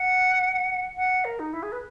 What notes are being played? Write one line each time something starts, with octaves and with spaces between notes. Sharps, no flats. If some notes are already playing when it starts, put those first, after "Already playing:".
Already playing: F#5
F#5
A#4
D#4
E4
G#4
B4